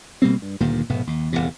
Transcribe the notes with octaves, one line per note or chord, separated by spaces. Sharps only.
B2 G3 A#3 C4
G2
D2 G2 A#2 D#3
F1 G#2 B2 B3
D#2
D1 G1 E2 C3